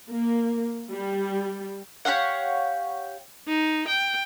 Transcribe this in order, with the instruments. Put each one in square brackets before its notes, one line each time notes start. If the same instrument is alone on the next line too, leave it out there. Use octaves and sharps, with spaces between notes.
[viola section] A#3
G3
[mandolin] G4 C#5 F5 F#5
[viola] D#4
G5